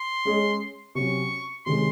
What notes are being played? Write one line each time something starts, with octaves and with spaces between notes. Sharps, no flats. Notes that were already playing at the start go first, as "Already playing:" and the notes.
Already playing: C6
G#3 C#4 G#4 D#5
C3 F#3 C#4 C#6
C3 D#3 G#3 C#4 G#4 C6